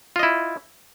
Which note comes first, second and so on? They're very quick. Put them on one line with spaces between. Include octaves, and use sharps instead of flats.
F4 D#5 E4